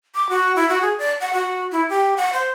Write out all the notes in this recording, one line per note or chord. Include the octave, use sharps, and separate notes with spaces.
D6
F#4
E4
F#4
G#4
D5
F#5
F#4
E4
G4
F#5
C5